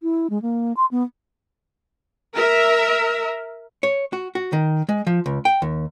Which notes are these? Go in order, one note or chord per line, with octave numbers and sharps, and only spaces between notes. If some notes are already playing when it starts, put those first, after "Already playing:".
E4
G#3
A#3
C6
B3
A#4 E5
C#5
F#4
F#4
D#3
G#3
F3
C#2
G5
D#2